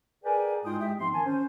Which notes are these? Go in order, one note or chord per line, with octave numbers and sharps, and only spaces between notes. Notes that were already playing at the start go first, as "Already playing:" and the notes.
G#4 A#4 B4 D5 G5 G#5
G#2 G#3 E4 F4 G5 D#6
G#3 G4 E5 G5
G#2 F3 B3 C4 C6
D#3 G#5 A5
C#4 C5